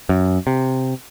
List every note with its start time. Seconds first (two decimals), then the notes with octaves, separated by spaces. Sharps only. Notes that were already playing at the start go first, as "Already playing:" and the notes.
0.09 F#2
0.47 C3